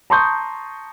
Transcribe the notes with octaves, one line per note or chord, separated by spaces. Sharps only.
A5 A#5 C6 C#6 D#6 G6